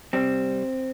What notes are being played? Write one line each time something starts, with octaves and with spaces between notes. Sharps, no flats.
C3 G3 C4